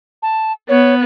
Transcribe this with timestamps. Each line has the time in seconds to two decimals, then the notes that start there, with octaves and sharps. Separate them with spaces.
0.23 A5
0.69 B3 C#5